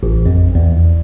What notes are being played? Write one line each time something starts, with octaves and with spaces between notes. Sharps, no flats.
A1
F2
E2